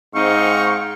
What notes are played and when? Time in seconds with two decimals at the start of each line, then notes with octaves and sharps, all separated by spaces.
0.15 G#2 C4 D#4 F5 C#6